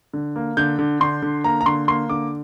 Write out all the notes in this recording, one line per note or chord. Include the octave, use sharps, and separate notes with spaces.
D3
A#3
D3 G6
D3
D3 C6
D3
A#3 A#5
A#5
D3 C6
A#3 C6
D3 D6